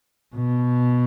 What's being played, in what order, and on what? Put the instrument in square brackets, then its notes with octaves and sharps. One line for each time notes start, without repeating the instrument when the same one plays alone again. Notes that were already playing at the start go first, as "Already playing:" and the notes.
[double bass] B2